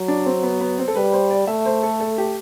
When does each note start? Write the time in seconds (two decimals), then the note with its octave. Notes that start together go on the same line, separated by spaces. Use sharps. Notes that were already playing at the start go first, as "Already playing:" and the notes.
Already playing: F#3
0.08 D4
0.26 C4
0.43 B3
0.60 B3
0.78 C4
0.88 A4
0.95 G3 B4
1.13 C5
1.31 D5
1.47 A3 E5
1.65 C5
1.83 A4
2.00 A4
2.18 G4